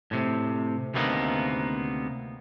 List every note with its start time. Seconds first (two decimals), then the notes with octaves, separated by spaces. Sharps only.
0.11 A2 C3
0.94 D2 C3 D#3 A#3 B3